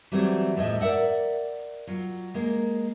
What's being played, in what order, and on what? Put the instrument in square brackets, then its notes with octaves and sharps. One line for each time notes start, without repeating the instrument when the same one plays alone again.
[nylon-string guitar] E3 F#3 G3 A3 C4 F#4
D#2 A2 F3 G#3 D#5 E5
A#4 D5 E5 F#5
F#3 F4
G#3 A#3